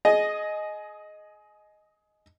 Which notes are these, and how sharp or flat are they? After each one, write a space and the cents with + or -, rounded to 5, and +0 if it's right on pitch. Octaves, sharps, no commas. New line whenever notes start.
G#4 +25 D#5 +0